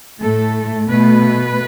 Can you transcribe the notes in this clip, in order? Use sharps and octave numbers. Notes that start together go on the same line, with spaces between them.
A2 A3 A4
B2 A3 B4